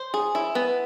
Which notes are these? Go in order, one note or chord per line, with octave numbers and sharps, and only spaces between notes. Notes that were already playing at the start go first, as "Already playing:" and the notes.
Already playing: C5
G#4
E4
B3